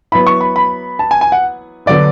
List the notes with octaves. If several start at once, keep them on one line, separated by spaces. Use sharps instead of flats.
F#3 B3 E4 B5
C#6
B5
B5
A5
G#5
G#5
F#5
D3 F#3 B3 D5